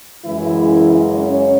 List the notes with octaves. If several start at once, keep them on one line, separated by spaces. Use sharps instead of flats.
F#2 C#3 E3 G#3 E4
C#4 C#5